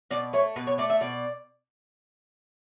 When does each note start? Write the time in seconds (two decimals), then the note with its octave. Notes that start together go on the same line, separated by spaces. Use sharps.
0.11 B2 D5
0.33 A3 C#5
0.56 B2 B4
0.67 C#5
0.78 A3 D5
0.90 E5
1.01 B2 D5